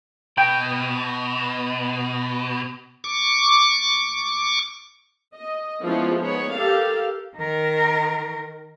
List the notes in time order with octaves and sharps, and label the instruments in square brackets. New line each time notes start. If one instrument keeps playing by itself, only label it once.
[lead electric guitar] B2 [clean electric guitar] G5
[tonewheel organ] C#6 D6
[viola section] D#5
F3 G#3 B3 C#4 E4 F4
B3 D#4 G#4 C#5
G4 A4 A#4 F5
[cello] D#3 A#4